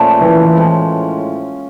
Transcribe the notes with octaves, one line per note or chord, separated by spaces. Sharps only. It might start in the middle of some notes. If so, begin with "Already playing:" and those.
Already playing: A#2 F3 A3 C#4
E3
A2 F3 G#3